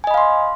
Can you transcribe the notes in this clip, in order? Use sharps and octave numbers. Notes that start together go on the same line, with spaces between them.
D#5 F5 G#5 B5 C6